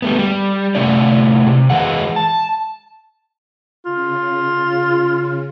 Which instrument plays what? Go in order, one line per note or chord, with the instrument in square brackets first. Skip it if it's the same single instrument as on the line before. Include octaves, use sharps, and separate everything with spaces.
[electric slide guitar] G3 A3 B3
G3
C3 A3 C#4 E4 D5
C3
E3 G#3 F#5
A5
[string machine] C#3 [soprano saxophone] F4